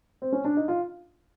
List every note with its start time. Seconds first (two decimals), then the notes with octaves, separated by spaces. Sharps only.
0.22 C4
0.32 C#4
0.45 D4
0.57 D#4
0.68 F4